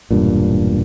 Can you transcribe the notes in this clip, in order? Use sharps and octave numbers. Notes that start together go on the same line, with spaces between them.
E1 G2 A#2